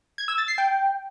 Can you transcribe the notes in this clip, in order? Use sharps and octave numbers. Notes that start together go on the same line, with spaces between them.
G#6
E6
A6
C7
G5